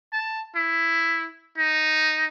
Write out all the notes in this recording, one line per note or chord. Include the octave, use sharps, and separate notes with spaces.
A5
E4
D#4